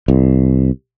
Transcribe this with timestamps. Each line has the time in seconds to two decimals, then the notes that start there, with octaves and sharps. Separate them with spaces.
0.08 C2